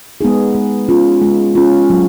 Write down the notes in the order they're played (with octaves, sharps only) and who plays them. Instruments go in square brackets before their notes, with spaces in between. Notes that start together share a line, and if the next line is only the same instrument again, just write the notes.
[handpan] G#3 B3 D#4 G#4
G#3
C#4 F4
G#3
C#4 F4
F#3